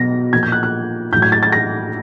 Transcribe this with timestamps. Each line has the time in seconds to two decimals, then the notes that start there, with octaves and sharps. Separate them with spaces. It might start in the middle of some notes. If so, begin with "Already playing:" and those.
Already playing: B2 F#3 A#6
0.33 A#2 F3 G#6
0.43 G6
0.52 F#6
0.63 F#6
1.12 A2 F#3 G6
1.22 G#6
1.32 A6
1.43 A6
1.52 A#6